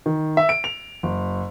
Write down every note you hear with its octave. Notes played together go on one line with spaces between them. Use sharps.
D#3
E5
D7
F7
F#1